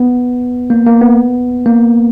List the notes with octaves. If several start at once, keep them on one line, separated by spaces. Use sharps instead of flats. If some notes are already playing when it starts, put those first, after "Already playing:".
Already playing: B3
A#3
A#3
B3
A#3